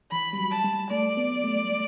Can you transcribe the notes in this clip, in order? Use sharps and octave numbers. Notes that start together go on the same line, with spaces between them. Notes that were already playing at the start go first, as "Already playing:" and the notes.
E3 B5
G3
F#3
A5
G3
A3 D5
B3
A3
A3